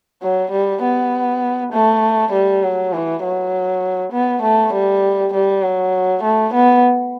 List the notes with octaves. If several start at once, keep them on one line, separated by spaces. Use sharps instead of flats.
F#3
G3
B3
A3
G3
F#3
E3
F#3
B3
A3
G3
G3
F#3
A3
B3